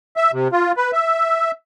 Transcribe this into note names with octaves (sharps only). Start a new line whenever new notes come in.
E5
C3
F4
B4
E5